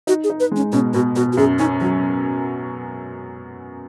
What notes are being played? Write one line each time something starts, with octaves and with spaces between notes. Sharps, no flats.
D#4 F#4
G#4
D#4
B4
G#3 C#4
B2 C#4
B2 F#4
B2 F#4
F#4
F#2 G#4
C#4 D#4
F#3 F#4